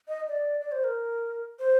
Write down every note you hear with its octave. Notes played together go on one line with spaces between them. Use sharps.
D#5
D5
D5
C5
A#4
C5